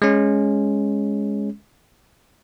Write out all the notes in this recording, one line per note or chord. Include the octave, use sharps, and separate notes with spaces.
G#3 C#4